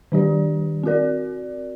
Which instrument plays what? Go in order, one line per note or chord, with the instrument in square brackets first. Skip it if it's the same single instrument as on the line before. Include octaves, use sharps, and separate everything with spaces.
[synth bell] D#3 G3 D4 G4 D5
C4 F#4 A#4 D5